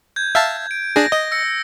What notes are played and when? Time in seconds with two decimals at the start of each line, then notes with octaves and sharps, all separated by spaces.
0.16 G6 G#6
0.35 E5 F5 A5
0.71 D7
0.96 D4 G#4 A#6
1.12 D#5
1.32 E6 A#6 C#7